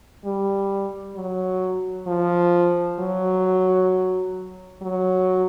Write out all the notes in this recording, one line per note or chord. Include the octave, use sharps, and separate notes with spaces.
G3
F#3
F3
F#3
F#3